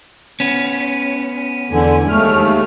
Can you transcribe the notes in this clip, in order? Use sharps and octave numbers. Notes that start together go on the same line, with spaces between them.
B3 C#4
E2 D3 G#5
D#2 G#3 A3 F6